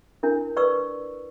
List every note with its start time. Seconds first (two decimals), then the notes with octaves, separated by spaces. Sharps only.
0.23 D4 E4 A#4
0.57 B4 D5 C#6 E6